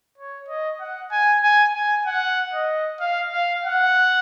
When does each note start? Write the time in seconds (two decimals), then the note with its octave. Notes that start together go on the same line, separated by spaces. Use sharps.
0.18 C#5
0.48 D#5
0.80 F#5
1.11 G#5
1.43 G#5
1.74 G#5
2.06 F#5
2.53 D#5
3.00 F5
3.32 F5
3.64 F#5